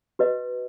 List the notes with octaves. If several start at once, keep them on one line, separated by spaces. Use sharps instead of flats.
F#4 B4 D#5